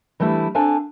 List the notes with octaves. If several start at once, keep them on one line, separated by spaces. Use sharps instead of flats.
E3 G3 A3 D4 E4
C4 D4 A4 C5 F5 G#5